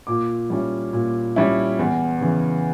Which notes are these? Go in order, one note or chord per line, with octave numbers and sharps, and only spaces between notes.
A#2 D6
G3 C#4 E4
A#2
G3 C#4 E4
E2
C#3 E3